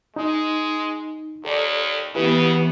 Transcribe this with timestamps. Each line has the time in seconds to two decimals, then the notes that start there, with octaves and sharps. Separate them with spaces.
0.16 G#3 D#4
1.45 D#2 A4 D5
2.15 C#3 E3 B3 E4 G4 B4